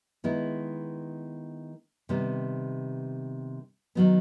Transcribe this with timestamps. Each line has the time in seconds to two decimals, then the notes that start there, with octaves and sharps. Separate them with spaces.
0.24 D#3 G#3 B3 E4
2.09 C3 D#3 G3 B3
3.95 D#3 F#3 B3